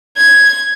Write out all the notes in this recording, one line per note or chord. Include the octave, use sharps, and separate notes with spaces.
G#6